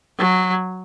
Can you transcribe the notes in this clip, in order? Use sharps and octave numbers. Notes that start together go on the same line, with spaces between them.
F#3